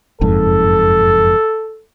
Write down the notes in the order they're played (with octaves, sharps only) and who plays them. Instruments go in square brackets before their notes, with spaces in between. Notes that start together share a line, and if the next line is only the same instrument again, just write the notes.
[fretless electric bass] F#1 F2 G#2 [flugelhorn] A4